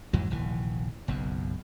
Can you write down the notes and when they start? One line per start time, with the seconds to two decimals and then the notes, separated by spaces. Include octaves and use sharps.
0.13 F2 G#2 E3 F#3
0.30 F1 A#1 D#2 E3
1.08 F#1 B1 F#2